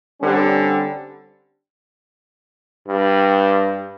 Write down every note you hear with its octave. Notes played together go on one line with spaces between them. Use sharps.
D3 G3 C4 C#4
G2